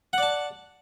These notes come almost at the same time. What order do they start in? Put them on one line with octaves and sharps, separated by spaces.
F#5 D5 A5